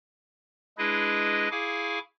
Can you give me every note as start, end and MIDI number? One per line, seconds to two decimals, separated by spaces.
0.78 1.48 56
0.78 1.48 62
0.78 1.48 64
0.78 1.48 68
0.78 1.48 71
0.78 1.48 75
1.51 1.99 64
1.51 1.99 68
1.51 1.99 77
1.51 1.99 80
1.51 1.99 85
1.51 1.99 86